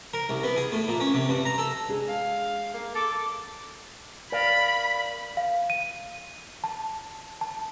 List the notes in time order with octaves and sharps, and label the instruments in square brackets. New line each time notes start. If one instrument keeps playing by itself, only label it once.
[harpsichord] A#4
C2
B3
G#4
A2
A#2
C#4
C3
G2
A#5
A4
[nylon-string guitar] G#3 D4 G#4
[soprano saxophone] F5
A#3
[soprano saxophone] A4 [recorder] D6
[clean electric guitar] A#4 D5 F5 [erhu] B5
[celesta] F5
D#7
A5
A5